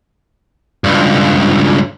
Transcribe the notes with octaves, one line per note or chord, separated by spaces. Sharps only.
C#2 G2